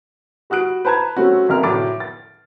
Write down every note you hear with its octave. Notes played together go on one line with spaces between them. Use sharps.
G3 F#4 D#6 F#6 D7
B4 C5 A5 A#5 G#6
F#3 G3 A3 C4 C#4 F#4
F#1 F2 A#4 F6
F1 A2 F#3 D6 A6 D7
A6